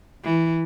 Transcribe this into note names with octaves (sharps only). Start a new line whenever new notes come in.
E3